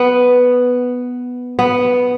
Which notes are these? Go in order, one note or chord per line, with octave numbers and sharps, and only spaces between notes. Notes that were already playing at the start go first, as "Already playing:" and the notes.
Already playing: B3
B3